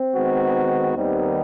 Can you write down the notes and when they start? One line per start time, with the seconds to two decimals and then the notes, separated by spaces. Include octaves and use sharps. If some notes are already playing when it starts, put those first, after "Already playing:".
Already playing: C4
0.14 D#3 G#3 B3 D#4 F#4
0.95 D#2 D#3 G3 B3 C4 D#4